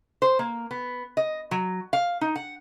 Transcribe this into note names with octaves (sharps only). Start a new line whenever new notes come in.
C5
A#3
B3
D#5
F#3
F5
D#4
F#5